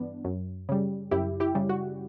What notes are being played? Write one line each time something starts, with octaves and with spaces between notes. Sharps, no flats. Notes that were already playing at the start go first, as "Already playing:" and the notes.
Already playing: G2 E3 B3 D4
F#2
C#3 G3
F#2 E4 G4
E4 G4
C#3 G3
F#4